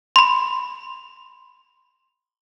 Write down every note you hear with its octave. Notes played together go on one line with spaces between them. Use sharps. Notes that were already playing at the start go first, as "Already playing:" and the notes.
B5 C6